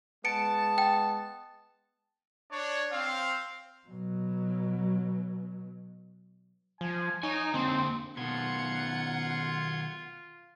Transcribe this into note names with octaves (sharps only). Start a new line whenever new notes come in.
G#3 B3 A5 C#7 D7
G5
D4 C#5
C4 F5
B2 F#3
F3 G#5
D#4 C#5 F#5 G#5
D3 A#3 C4 C6
B2 D#3 F4 F#5 C6 G#6 C#7